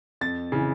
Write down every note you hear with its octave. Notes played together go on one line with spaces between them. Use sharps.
F2 A6
C#3 E3